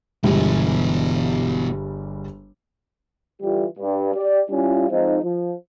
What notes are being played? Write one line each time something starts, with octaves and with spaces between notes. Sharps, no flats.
G1 B2 E3 G3 G#3
D3 E3 G3 F4 G4
G2
G4 D5
G3 C#4 E4 F4
F3 G#3 C4 D#4
F3